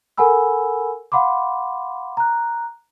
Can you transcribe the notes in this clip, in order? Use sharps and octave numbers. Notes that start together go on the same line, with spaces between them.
A4 A#4 F#5 G#5 B5 E6
F5 F#5 B5 C6 D6
A#5 F#6